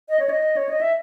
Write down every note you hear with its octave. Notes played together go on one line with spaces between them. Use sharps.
D#5
C#5
D#5
C#5
D#5
E5